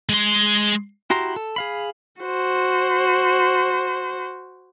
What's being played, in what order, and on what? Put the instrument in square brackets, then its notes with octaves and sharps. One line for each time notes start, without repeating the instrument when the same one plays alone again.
[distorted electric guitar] G#3 C6
[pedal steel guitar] E4 F#4 G4 A#5 C6
A4
G#4 F5 B5
[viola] F#4 C5